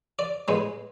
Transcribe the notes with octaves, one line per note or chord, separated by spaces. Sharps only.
D5
A2 G#3 B3